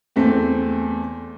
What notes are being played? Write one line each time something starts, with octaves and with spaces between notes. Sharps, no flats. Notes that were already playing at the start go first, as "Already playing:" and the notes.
E2 A3 C4